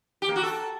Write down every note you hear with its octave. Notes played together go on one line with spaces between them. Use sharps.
G4
A#3
F#4
A4